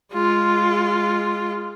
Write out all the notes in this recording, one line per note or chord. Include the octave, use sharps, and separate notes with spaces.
G#3 F4